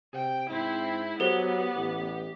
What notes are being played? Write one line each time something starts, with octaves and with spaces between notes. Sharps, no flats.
C3 G5
G#2 C4 E4
F#3 B3 G4 A4 C5
A1